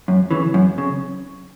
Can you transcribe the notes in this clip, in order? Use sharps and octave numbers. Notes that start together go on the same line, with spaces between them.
F#2
C#3 E3
F#2
C#3